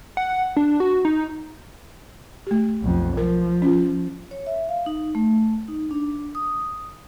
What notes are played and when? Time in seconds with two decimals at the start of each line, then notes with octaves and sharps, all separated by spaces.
0.17 F#5
0.57 D4
0.80 F#4
1.05 D#4
2.47 A3 G4
2.82 B1 F2
3.17 F3 A#4
3.62 C#4 F4
4.31 C#5
4.47 E5
4.69 F5
4.86 D#4
5.15 A3
5.68 D#4
5.91 D4
6.35 D#6